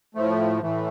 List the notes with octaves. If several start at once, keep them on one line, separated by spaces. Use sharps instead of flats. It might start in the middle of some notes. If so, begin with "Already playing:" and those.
A2 F3 A3
A2 E3 A3